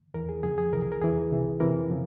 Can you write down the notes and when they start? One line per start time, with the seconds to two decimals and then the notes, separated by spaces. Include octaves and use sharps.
0.14 E2 E3 A#4
0.29 G#4
0.43 F2 C#3 F3 G#4
0.58 G#4
0.72 C2 C3 E3 A#4
0.82 G#4
0.92 A#4
1.01 E2 E3 G#4
1.31 C2 C3 E3
1.60 F2 C3 E3 A#4
1.90 C#3 F3